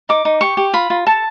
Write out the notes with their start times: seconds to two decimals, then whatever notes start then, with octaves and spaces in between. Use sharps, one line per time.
0.09 D#4 D6
0.25 D#4
0.41 G4 C#6
0.57 G4
0.73 F4 B5
0.90 F4
1.06 A4 A5